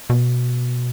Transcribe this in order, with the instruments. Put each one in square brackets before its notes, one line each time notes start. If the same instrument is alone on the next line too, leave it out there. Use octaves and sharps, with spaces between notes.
[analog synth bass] B2